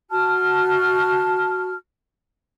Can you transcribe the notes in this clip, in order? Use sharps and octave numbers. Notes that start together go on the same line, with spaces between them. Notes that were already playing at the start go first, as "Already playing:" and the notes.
F#4 A5 F6